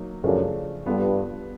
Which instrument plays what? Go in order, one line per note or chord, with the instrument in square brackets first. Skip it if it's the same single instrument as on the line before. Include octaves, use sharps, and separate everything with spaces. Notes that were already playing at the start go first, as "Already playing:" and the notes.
Already playing: [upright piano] F#3 A#3 D#4
[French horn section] F#2 [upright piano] C#3 F3 A3 D4
[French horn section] G2 [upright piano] G3 B3 D4 F4 A4